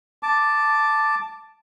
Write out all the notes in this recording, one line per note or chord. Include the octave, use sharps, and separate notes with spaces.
A5 D6